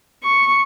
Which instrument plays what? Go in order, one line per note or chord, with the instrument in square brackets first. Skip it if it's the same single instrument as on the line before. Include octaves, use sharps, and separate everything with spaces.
[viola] C#6